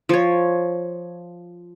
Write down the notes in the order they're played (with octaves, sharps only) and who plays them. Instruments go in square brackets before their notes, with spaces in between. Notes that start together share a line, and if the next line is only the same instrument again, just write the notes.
[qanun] F3 C#5